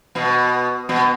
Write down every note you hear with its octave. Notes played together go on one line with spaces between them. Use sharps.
B2 B3
B2 B3